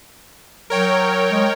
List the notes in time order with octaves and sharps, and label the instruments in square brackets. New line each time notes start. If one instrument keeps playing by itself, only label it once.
[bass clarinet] F#3 [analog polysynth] A#4 C#5 G5
[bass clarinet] G#3